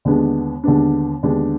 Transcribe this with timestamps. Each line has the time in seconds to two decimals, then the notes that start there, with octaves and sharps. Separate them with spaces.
0.05 D#2 D3 G#3 B3 D4
0.64 D#2 D3 G#3 B3 D4
1.23 D#2 D3 G#3 B3 D4